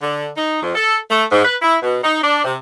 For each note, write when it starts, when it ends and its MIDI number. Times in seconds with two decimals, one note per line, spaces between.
0.01 0.26 50
0.37 0.61 63
0.62 0.73 41
0.75 0.98 69
1.10 1.23 57
1.31 1.44 44
1.45 1.56 71
1.62 1.77 64
1.82 1.98 47
2.03 2.22 63
2.23 2.40 62
2.44 2.55 48